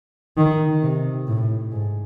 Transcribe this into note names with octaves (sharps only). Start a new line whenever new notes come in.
D#3
C3
A2
G#2